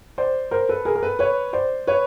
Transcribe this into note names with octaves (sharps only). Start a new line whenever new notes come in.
C5 D5
A#4 C5
A4 B4
G#4 A#4
A#4
A4 B4
B4 C#5
C5 D5
B4 C#5